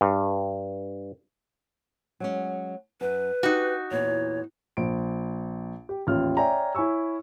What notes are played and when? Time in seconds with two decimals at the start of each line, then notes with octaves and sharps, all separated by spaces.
0.01 G2
2.20 F#3 G#3 C#4
3.01 F#2 B4
3.43 D#4 F#4 G4
3.91 E2 A#2 C#5
4.77 A#1 D7
5.89 G4
6.07 A1 D#2 F4 F6
6.37 C#5 D5 E5 G5 G#5 A#5
6.75 E4 C#5 G#5 C#6 E6